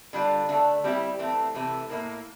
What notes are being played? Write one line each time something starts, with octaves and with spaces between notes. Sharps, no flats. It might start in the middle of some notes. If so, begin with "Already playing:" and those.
D3 G3 D4 F4
D3 A3 D4
G3 C4 E4 G4
E3 A3 C4
C3 E3 A3
A2 F3 A#3 E4 A#4